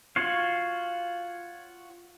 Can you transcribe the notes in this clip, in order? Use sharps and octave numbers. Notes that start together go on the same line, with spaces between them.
F4 F#4 C#5 F5